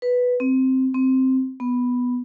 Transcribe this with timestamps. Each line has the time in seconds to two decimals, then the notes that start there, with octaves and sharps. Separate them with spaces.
0.02 B4
0.40 C4
0.94 C4
1.60 B3